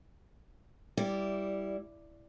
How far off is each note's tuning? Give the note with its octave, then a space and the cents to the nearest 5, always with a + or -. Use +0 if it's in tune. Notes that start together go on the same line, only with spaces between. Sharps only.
G3 +0 E4 +0 D5 -10